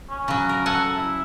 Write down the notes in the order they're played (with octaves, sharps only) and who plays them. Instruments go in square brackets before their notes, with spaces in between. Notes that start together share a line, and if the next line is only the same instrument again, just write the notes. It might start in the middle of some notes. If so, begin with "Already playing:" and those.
[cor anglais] C#4
[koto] C#3 F#3
A#4
[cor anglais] A4 [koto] F#5 G#5
[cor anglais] E4